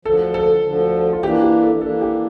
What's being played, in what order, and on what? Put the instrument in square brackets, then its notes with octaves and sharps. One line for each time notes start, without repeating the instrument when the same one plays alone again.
[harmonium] D2 D3 F3 [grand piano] A4
[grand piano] A4
[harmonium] D2 D3 F3
[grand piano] F4
[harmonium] E3 A#3 D4 [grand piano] G4
[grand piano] G4
A4
[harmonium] E3 A#3 D4 [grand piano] A4
[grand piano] G4